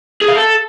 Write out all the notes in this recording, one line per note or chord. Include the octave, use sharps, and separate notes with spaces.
G#4
F5
A4